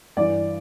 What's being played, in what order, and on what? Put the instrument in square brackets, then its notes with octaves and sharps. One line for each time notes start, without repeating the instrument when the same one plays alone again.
[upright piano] G2 E3 D5